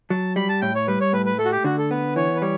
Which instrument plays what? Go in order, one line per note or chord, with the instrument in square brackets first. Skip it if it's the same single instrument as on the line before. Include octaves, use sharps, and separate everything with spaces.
[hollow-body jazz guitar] F#3 [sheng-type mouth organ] A5
[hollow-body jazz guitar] G3 [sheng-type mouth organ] B5
[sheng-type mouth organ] A5
[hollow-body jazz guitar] A2 [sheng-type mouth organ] G5
[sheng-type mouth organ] C#5
[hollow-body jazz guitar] G3 [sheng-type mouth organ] B4
[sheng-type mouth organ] C#5
[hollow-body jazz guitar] A2 [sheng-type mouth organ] B4
[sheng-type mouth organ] B4
[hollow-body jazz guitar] A3 [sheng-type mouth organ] A4
[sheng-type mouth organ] F#4
G4
[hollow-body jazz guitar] D3 [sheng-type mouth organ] F#4
[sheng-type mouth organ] A4
[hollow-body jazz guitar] B3 [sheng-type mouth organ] B4
[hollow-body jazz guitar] E3 [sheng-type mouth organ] C#5
[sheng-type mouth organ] B4
[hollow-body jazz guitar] G3 [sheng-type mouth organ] C#5